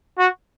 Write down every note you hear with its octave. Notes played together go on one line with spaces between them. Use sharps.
F#4